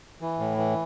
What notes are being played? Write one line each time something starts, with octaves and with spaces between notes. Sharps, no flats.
E3
A2
E3